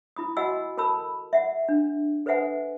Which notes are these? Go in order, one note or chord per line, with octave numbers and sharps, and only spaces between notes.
E4 B5 D#6
F#4 D#5 F#5 G#5 B5 E6
A4 A#4 A5 B5 E6
E5 F#5
D4
A4 B4 C5 E5 F#5 G#5